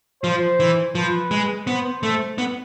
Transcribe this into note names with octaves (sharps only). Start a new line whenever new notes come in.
F3 C5
E3
F3 B4
G#3
B3 C5
A3
B3